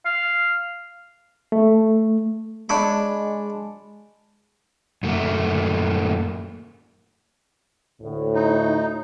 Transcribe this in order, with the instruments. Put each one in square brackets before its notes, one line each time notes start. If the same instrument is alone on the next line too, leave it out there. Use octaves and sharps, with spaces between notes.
[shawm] F5
[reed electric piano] A3
[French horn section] G#3 [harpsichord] D4 C#5 B5
[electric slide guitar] F#2 A3 A#3
[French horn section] D2 A2
[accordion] D#4